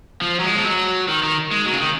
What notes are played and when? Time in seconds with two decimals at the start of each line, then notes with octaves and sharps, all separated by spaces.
0.22 F3
0.40 F#3
0.44 G#3
0.56 F3
0.64 F#3
1.08 D#3
1.23 D#3
1.51 G#3
1.66 F#3
1.72 C#3
1.80 D#3